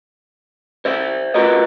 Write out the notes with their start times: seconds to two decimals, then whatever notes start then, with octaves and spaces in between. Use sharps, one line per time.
0.85 C5 D5 E5
1.34 F4 F#4 A#4 B4 D#5